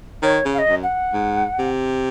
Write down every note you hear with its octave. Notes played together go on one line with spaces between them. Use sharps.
D#3 C#5
C#3
F5
D#5
F#2
F#5
G#2
C3